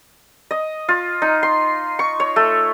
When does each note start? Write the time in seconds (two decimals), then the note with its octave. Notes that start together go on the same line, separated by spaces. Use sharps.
0.51 D#5
0.89 F4
1.22 D#4
1.43 C6
1.99 C#6
2.20 C#5
2.36 A3